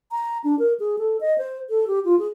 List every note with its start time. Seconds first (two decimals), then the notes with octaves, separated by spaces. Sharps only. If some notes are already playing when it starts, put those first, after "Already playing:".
0.11 A#5
0.44 D4
0.59 A#4
0.80 G#4
0.98 A4
1.21 D#5
1.38 C5
1.70 A4
1.87 G4
2.05 F4
2.19 G#4